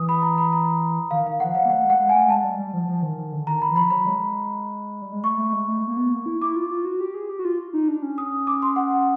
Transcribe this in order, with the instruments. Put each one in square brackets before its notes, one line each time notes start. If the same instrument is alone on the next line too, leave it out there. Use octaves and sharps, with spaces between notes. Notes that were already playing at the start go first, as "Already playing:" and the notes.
Already playing: [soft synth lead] E3 [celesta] D#6
[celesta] B5
A#5
B5
A#5
[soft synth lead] D#3 [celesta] F5
[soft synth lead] D#3 [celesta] F5
[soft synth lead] F3 [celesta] F#5
[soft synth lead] F#3 [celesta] F5
[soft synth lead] A#3
[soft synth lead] A3 [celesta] F#5
[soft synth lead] G#3
[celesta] F#5
[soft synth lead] G#3
[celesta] G#5
[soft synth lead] A3
[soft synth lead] G#3 [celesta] A5
[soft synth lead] G3
G3
F3
F3
D#3
D#3
D3
[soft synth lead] D#3 [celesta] A#5
[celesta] B5
[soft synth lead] E3
[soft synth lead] F3 [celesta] B5
[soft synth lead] F#3 [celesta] B5
[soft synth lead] G#3
G3
G#3
[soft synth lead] A3 [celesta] C#6
[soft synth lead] A3
G#3
A3
A#3
B3
A#3
E4
[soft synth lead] E4 [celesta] D6
[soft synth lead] F4
F4
F#4
G4
G#4
G4
F#4
F4
D#4
D4
C#4
[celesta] D#6
D6
C6
F#5